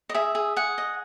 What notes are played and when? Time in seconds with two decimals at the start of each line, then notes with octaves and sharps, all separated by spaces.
0.09 D#5
0.14 G#4 E5
0.35 G#4
0.56 G#4 F#5
0.78 D#5